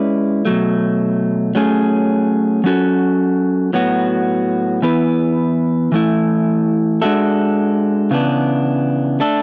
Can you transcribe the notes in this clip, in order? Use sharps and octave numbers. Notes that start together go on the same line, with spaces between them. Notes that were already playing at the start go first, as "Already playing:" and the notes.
Already playing: G#3 C#4 E4 B4 D5
B2 F#3 A3
F#3 A3 C#4 G#4
F#3 C#4 F#4 A4
A2 F#3 B3 F#4
E3 B3 E4 B4
E3 A3 E4
G#3 D4 F#4 A4 E5
C#3 E3 B3 D4
A3 D4 A4